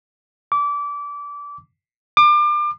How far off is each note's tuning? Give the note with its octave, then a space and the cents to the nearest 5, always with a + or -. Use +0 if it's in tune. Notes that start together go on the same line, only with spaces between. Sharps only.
D6 -25
D6 +30